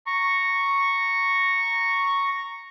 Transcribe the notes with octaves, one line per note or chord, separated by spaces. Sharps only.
A#5 C#6